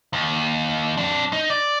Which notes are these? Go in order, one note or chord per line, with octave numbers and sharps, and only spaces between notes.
D#2
F2 D4
D#4
D5